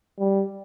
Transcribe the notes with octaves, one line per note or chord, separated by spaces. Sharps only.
G3